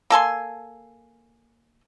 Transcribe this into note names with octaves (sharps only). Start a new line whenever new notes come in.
A#3 A4 G#5 C6